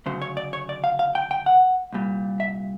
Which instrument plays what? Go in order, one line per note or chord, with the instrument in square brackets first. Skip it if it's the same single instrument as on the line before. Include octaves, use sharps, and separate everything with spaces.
[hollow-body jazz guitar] D2 C#3 F#3 C5
C#5
D5
C#5
D5
F5
F5
G5
G5
F#5
C2 A#2 G3
E5